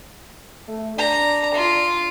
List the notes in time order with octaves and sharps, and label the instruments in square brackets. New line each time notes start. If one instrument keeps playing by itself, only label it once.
[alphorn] A3
[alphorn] D4 [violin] A#5
[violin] F4